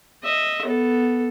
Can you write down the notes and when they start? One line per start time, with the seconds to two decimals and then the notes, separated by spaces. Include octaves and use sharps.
0.24 D#5 E5
0.65 B3 A4